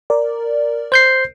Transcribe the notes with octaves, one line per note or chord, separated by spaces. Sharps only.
A#4 D5
C5 G6 C7